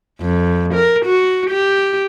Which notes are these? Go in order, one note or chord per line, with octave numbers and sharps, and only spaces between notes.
F2
A#4
F#4
G4